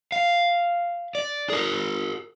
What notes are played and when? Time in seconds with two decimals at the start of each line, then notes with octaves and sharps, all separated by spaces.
0.12 F5
1.15 D5
1.50 G#4 A#4